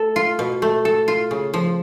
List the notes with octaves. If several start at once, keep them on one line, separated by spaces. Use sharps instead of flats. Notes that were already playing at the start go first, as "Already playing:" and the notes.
Already playing: A3 A4
F4
B2
A3
A4
F4
C#3
F3